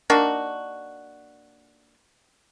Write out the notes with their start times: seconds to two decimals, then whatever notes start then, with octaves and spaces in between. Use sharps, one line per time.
0.10 A#3 D4 D#4 F#4